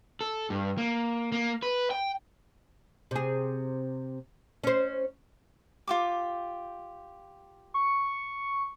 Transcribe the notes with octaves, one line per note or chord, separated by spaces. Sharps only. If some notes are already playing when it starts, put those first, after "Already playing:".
A4
G2
A#3
A#3
B4
G5
C3 G#4
C#4 C5
F4 G4 D6
C#6